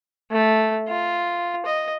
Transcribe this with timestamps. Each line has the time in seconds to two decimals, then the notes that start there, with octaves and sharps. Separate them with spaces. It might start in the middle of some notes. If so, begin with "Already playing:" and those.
0.32 A3
0.88 F4
1.66 D#5